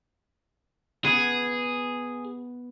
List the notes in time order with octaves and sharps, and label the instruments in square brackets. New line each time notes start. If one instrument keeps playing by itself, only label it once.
[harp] B3 [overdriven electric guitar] G#4